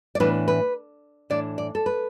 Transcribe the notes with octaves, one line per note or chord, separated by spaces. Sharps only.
D5
A2 E3 B3 D4 B4
B4
A2 E3 D4 D5
D5
A4
B4